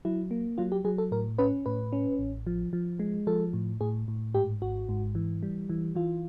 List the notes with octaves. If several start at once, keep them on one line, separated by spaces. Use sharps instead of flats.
F#3 E4
A#3
F#3 F4
G4
F#3 G#4
A4
A2 A#4
C#4 B4
A2 B4
C#4
A1
F3
F3
G#3
F3 A4
A2
A2 G#4
A2
G#2 G4
G#1 F#4
G#2
E3
G3
E3
E3 F4